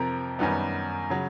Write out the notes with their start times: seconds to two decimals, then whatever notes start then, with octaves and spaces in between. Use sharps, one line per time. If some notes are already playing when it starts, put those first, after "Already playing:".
Already playing: F2 C3 F3 A#4
0.39 F#2 D#3 G3 B3
1.10 C#3 F#3